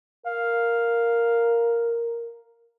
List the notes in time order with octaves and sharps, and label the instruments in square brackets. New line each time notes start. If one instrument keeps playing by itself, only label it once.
[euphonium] A#4 [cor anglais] F5